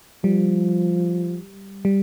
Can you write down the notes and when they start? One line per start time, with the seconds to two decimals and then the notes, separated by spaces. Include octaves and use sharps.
0.24 F3 G3
1.85 G3